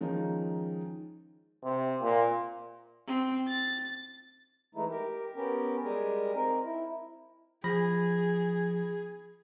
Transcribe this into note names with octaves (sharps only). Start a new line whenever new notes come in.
D#3 F3 G#3 C#4 D#4
C3
A#2
C4
A6
E3 G#3 A3 D#4 E4
G4 A#4
B3 C#4 G4 A#4
G3 G#3 G4 G#4 A#4
C4 D#4 A#4
E4
F3 G#4 B5 A#6